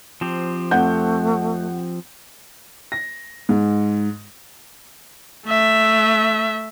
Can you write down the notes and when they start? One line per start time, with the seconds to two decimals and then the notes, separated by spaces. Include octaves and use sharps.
0.21 F3 C4 G4
0.71 F2 A3 F#5 G6
2.92 A#6
3.49 G#2
5.47 A3 E5